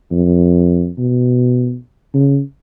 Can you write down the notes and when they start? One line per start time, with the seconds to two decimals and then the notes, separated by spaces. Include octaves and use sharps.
0.11 F2
0.98 B2
2.14 C#3